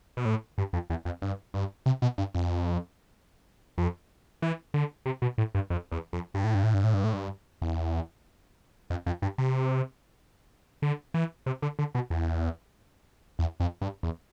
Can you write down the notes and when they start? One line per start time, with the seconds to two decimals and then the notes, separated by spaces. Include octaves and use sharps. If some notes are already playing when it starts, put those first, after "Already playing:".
0.17 B2
0.25 A2
0.58 G2
0.73 F2
0.90 E2
1.05 F2
1.22 G2
1.54 G2
1.86 C3
2.02 B2
2.18 G2
2.34 F2
3.78 F2
4.42 E3
4.74 D3
5.06 C3
5.22 B2
5.38 A2
5.55 G2
5.70 F2
5.92 E2
6.13 F2
6.34 G2
6.44 A2
6.54 G2
6.63 A2
6.74 G2
6.84 A2
6.94 G2
7.04 A2
7.13 G2
7.62 E2
8.90 F2
9.06 F2
9.22 G2
9.38 C3
10.82 D3
11.14 E3
11.46 C3
11.62 D3
11.79 D3
11.95 B2
12.10 E2
13.39 E2
13.60 F2
13.81 G2
14.03 E2